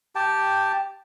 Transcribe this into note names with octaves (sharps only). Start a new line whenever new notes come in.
G4 G5 A5